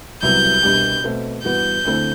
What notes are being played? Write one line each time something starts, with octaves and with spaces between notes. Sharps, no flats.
C2 C3 F#3 B3 E4 G6
C2 B2 G3 D4 G4
B2 A3 C4
G2 E3 B3 F#4 G6
D2 D3 A3 C4 E4